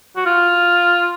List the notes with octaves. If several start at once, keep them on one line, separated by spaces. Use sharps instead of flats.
F#4
F4